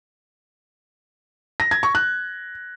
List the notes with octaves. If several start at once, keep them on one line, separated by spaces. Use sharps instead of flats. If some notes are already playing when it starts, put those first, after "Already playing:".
A#6
G#6
C#6
F#6